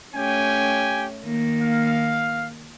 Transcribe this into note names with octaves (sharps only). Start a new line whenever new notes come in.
A3 C#4 G4 G5 G#5
D#3 A#3
F5